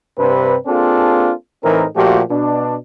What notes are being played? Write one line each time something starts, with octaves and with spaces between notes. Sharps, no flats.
G2 C3 C4 D4 B4
A#3 C4 D4 F4 G#4 A4
A2 E3 C4 D#4 A#4
A#2 F3 A3 F#4 G4
B2 D4